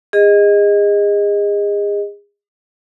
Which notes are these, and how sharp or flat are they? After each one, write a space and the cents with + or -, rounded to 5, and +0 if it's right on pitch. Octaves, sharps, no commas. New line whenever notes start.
G#4 -30 D#5 +0